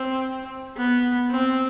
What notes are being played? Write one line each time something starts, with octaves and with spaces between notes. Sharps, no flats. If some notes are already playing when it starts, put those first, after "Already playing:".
Already playing: C4
B3
C4